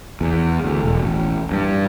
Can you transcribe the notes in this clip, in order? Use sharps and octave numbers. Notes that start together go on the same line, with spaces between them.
E2
D2
E1
A1
G2